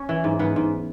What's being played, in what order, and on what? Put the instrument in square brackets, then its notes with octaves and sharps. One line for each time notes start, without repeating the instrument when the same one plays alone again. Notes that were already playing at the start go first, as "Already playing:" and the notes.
Already playing: [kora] C#4 C#5
E3
G#2
G#2 B3 B4
G#2